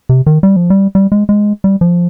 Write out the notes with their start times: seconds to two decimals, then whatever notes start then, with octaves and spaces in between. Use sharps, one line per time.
0.09 C3
0.26 D#3
0.43 G3
0.56 F3
0.70 G3
0.95 G3
1.12 G#3
1.29 G#3
1.64 G3
1.81 F3